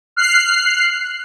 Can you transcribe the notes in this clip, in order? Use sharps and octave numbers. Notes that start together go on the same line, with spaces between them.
F6 F#6 C7